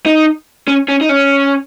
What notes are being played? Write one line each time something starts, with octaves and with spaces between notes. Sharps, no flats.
D#4
C#4
C#4
D#4
C#4